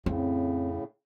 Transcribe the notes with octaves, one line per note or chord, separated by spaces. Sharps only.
F2 A2 C#3 C4